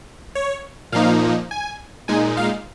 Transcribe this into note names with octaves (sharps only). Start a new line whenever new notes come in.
C#5
A#2 F3 A#3 D#4 F5
G#5
A#2 G#3 D#4 G#5
F5